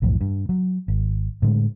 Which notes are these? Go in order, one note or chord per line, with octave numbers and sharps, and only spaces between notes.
B1 F2 A2 E3
G2
F#3
G#1
A2 D3 G#3